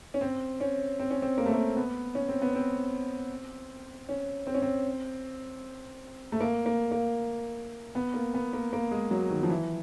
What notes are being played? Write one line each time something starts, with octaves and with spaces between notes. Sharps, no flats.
C#4
C4
C#4
C4
C#4
C4
A#3
A3
A#3
B3
C#4
C4
B3
C4
C#4
C4
C#4
C4
A3
A#3
A#3
A#3
B3
A#3
B3
A#3
A#3
G#3
F#3
D#3
F3
E3